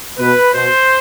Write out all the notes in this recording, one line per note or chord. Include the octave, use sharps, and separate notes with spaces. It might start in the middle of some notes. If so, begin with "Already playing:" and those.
B2 B4
B2 C5